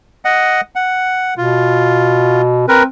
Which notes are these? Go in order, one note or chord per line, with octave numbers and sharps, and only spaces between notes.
D#5 F#5
F#5
B2 F4
C4 A#4 B4